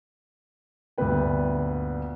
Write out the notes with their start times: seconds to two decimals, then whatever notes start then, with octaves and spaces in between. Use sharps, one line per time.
0.98 D2 G2 A#2 B3 B4 G5